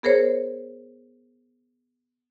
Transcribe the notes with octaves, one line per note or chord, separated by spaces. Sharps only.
B3 G#4 A#4 C5 C#5